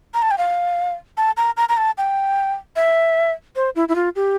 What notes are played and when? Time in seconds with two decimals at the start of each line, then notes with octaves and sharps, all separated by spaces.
0.14 A#5
0.22 A5
0.31 G5
0.38 F5
1.17 A5
1.37 A#5
1.57 A#5
1.69 A#5
1.77 A5
1.98 G5
2.76 E5
3.56 C5
3.76 E4
3.89 E4
3.95 F4
4.16 G4